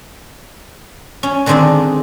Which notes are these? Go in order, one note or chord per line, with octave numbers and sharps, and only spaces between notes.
C#4
D3 D#3 G#3 C4 D4 D#4